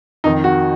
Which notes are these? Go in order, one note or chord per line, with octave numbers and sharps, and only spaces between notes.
F2 D#3 D#4
F#4